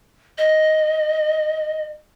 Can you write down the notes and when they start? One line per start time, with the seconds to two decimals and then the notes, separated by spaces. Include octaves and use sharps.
0.38 D#5